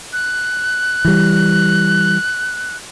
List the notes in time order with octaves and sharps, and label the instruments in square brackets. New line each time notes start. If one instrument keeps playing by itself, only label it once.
[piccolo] F#6
[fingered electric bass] E3 G3